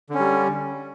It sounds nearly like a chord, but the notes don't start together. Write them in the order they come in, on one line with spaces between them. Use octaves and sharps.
D3 C#4 G3